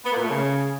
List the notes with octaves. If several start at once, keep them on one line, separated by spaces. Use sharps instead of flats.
B3
A#3
A#2
A3
C#3